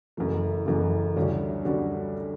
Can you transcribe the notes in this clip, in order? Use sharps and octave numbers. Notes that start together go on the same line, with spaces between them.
F#1 F#2 E3 A3
F#1 F#2 E3 A3
D2 D3 G3 C#4 F#4
D3 G3 C#4 F#4